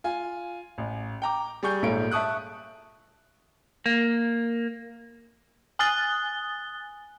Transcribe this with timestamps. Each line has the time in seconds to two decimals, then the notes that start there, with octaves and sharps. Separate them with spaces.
0.04 F4 G#5
0.78 A1
1.22 G5 A#5 D6
1.63 G3 G#4 C#6 G6
1.82 A#1 G#2 A3 F4 C#5 D7
2.11 E5 A5 C#6 D#6 F#6
3.86 A#3
5.79 G#5 D#6 F#6 A6 G7